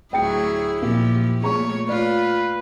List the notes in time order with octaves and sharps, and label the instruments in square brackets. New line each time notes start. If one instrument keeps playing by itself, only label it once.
[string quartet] D2 A2 F#3 [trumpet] E4 [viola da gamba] G#4 [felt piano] G5 C#7
[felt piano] A#2 [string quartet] F3 [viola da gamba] G4
[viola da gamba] A#2 C#5 [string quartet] A3 [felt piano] G#4 A#5 C#6
[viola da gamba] F4 [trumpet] B4 [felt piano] D5